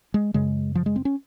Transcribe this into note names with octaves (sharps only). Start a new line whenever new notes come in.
G#3
F#2 C#3 G#3
F3
G#3
C4
C#4